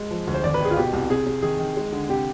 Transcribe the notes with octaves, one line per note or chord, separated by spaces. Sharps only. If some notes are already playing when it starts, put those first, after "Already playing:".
Already playing: G#3
F3
D2
C5
G#1 D5
B4
D#3 G#4
F4
B2 G4
C2
C3 G#4
C3
D#3 G#4
D#3
G#3
D3
C3 G4